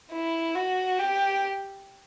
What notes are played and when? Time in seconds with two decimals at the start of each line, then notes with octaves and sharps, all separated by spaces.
0.12 E4
0.55 F#4
0.99 G4